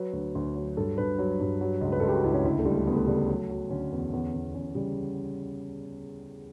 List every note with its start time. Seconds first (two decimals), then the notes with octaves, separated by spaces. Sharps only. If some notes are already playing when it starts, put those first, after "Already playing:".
Already playing: F#3 B4
0.13 D2
0.35 D2
0.55 F#3
0.77 G2 A4
0.98 G2 B4
1.18 F#3
1.40 G2
1.61 F#3
1.81 C#2
1.92 B4
2.00 C#2 A4
2.08 G4
2.16 F#4
2.24 C#2 E4
2.33 C#4
2.44 D2 E4
2.59 A3
2.65 D2 G3
2.76 A3
2.87 D2 B3
2.96 A3
3.06 C#3 G3
3.15 A3
3.29 F#3
3.49 F#3
3.70 D3 C#4
3.92 E2
4.13 E2
4.34 E2
4.54 E2 C#4
4.65 B3
4.75 C#3 G3